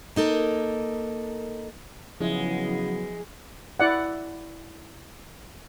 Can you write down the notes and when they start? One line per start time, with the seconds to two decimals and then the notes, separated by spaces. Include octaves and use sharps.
0.16 A#3 D#4 A4 A#4
2.20 C#3 F3 F#3 G#3 B3 E4
3.80 E4 D5 F#5